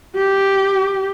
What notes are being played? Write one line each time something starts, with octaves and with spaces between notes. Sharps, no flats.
G4